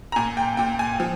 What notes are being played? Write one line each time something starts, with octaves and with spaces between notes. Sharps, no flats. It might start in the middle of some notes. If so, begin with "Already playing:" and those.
A#5
A#2 G#5
G5
A#2 G5
G#5
F3